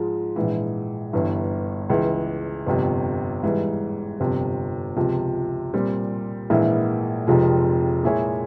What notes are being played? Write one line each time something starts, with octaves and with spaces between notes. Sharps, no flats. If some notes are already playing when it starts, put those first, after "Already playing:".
Already playing: G#2 F3 G#3
A#1 G#2 E3
G1 G2 E3
C#2 C#3 E3
G1 F2 C3
G#2 E3 G3
G1 F2 C3 F3
C#2 C3 F3
A#2 G3 C4
A#1 G#2 E3 A#3 E4
F1 F2 C3 F3 G#3
A#2 G#3 E4 G#4 C#5